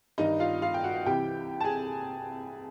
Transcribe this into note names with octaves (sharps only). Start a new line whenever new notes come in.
G2 D#3 G3 D#4 D#5
F4 F5
F4 F5
G5
F#4 F#5
C2 C3 E3 G4 G5
A5
G#4 G#5